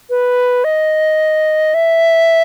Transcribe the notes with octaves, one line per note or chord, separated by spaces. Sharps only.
B4
D#5
E5